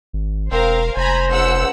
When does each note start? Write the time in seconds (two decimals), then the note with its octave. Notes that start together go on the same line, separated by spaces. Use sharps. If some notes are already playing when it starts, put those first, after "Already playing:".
0.13 G#1
0.51 E1 C4 A#4 C5 F5
0.96 F1 C5 G#5 A#5 B5
1.31 C#2 F#5 E6